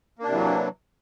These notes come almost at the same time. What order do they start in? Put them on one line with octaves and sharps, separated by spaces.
A#3 D4 C3 E3 F#3